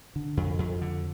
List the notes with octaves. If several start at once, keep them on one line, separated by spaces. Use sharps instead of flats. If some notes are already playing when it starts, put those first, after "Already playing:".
D3
F2
F2
D3